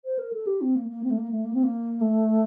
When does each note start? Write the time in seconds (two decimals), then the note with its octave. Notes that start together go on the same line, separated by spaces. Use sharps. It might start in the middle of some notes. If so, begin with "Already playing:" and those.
0.05 C5
0.18 A#4
0.33 A4
0.47 G4
0.61 C4
0.75 A#3
0.89 A#3
1.03 C4
1.10 A3
1.17 A#3
1.31 A3
1.45 A#3
1.54 C4
1.63 A#3
2.01 A3